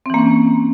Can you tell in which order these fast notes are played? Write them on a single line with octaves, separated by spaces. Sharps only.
C4 E3 A#3 C#4